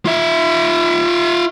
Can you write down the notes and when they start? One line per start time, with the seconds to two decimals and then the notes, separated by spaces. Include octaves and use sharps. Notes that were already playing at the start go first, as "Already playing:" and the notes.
0.05 F4 E5